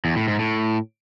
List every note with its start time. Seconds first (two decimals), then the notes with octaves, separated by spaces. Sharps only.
0.05 E2
0.16 A2
0.28 G#2
0.39 A2